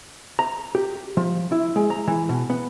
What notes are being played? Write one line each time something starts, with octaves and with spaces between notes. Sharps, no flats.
A#5
G4
F3
E4
G#3
A#5
E3
B2
B3